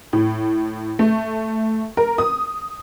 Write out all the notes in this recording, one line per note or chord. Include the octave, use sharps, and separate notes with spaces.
A2
A3
A#4
D#6